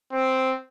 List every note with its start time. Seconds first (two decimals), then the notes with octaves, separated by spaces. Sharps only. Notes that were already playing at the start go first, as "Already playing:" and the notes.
0.12 C4